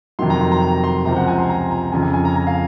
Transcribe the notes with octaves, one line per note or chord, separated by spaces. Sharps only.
F2 C3 D#3 F#3 C6
A#5
C6
A#5
A#5
C6
C#2 C3 F3 C4 A#5
F#5
G#5
C6
A#5
A#5
F2 C#3 F3 G#5
G#5
G#5
A#5
A#5
F5